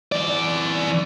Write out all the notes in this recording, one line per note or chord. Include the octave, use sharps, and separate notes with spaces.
E3 D5